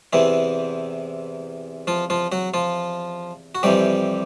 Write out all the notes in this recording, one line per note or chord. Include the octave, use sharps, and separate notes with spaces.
E2 C3 E3 E4
F3 F4
F3 F4
F#3 F#4
F3 F4
F#4
F2 C3 E3 G3 G4